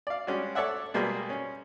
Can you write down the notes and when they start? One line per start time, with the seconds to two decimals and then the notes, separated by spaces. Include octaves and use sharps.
0.07 D5 F5
0.27 G3 G#3 C#4 D4 F#4
0.55 A4 C#5 D5 E5 F#5
0.94 B2 G3 G#3 A#3 B3 G#4
1.30 C#4